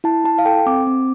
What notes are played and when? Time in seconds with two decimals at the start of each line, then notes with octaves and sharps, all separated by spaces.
0.04 E4 A5
0.24 E4 A5
0.38 F5
0.46 A4 G5
0.66 C4 D6
0.87 C4